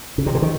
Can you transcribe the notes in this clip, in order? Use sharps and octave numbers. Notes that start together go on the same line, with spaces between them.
C#3
C3
D3
D#3